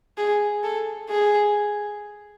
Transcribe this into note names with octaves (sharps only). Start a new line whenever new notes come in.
G#4
A4
G#4